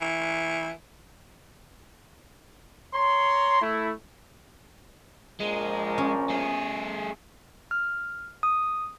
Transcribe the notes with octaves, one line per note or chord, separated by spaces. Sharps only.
E3
C#5 A#5 C6
A3 E4
A#1 F3 G#3 A#4
C#4
A3 G#4
F6
D#6